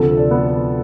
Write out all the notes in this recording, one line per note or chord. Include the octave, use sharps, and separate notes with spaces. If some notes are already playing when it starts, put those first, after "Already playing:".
Already playing: D2 C3 F3 A4
D4
B3